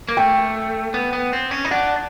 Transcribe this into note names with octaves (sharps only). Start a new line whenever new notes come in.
A#3
A3 G5
B3
B3
C4
C#4
D#4
D4 F#5